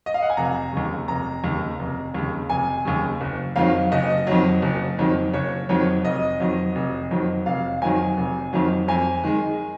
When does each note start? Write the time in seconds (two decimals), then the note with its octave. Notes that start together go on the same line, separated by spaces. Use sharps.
0.06 D#5
0.14 F5
0.22 F#5
0.30 G#5
0.37 F1 A#5
0.73 D#2 C#3
1.08 F1 A#5
1.44 D#2 C#3
1.79 F1
2.14 D#2 C#3
2.50 F1 G#5
2.85 D#2 C#3
3.21 F#1
3.56 F2 D#3 F#3 F5
3.92 F#1 D#5
4.27 F2 D#3 F#3
4.62 F#1
4.99 F2 D#3 F#3
5.34 F#1 C#5
5.69 F2 D#3 F#3 C#5
6.05 F1 D#5
6.40 F2 D#3 F#3
6.75 F1
7.11 F2 D#3 F#3
7.46 F1 F5
7.81 F2 D#3 F#3 G#5
8.18 F1
8.53 F2 D#3 F#3
8.88 F2 G#5
9.24 D#3 G#3